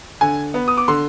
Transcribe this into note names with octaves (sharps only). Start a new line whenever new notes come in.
D3 G#5
B3
D#6
D6
D3 C6